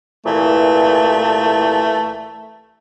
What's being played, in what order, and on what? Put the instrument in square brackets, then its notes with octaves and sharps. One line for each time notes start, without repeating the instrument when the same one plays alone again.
[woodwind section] C2 A#2 E3 [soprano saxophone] A3